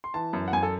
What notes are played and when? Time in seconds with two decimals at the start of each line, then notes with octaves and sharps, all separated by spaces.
0.04 C6
0.14 E3 A5
0.33 F#2
0.48 F#5
0.53 F#2 G#5
0.63 A4